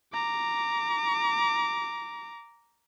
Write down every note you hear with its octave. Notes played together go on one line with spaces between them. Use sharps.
A#5 D6